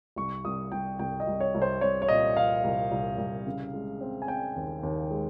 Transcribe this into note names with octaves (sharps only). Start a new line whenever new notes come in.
C2 C#6
C2 D#6
C2 G5
C2 G5
D#5
C2
C#5
C2
C5
G3 C#5
C#5
A#2 D#5
A#2 F5
C2
C2
C2
C#3
G#3
C4
G#5
C4 G5
D#2
D#2
G#3